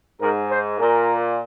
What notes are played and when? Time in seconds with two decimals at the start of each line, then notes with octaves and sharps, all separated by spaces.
0.21 G#2 A#4
0.51 C5
0.79 A#2 A#4